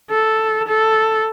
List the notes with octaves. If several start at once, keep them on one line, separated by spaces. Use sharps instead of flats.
A4
A4